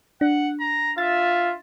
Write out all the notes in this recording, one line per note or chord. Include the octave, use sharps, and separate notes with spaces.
D4 F#5
A#5
F4 E5 A6